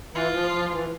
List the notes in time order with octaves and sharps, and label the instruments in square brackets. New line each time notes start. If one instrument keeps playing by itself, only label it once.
[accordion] E3 [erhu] F4
[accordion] F3
F3
E3